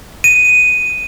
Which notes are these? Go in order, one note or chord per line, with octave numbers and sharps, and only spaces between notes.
D#7